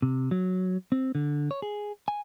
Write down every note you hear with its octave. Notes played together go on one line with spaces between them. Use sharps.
C3
F#3
C4
D3
C#5
G#4
G#5